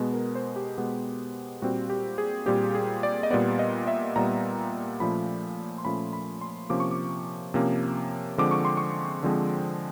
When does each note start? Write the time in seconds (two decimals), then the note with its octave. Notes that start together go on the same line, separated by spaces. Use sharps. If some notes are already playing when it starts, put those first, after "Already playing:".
Already playing: B2 G#3 B3
0.14 A#4
0.35 C5
0.56 G4
0.78 B2 G#3 B3
1.62 A#2 G3 C4 F#4
1.90 G4
2.18 G#4
2.46 A#2 G3 C4 G4
2.75 G#4
3.03 D5
3.23 D#5
3.30 A#2 G3 B3 D5
3.59 D#5
3.88 E5
4.16 A#2 G3 B3 A#5
5.00 A#2 F3 A3 C#4 B5
5.78 C6
5.85 A#2 F3 A3 C#4 B5
6.13 B5
6.41 C6
6.70 C3 F3 A#3 C#4 D6
6.80 C#6
6.91 D6
7.54 C3 F3 A#3 C#4
8.38 D3 F3 G#3 C4 D6
8.51 C#6
8.65 C6
8.77 C#6
9.23 D3 F3 G#3 C4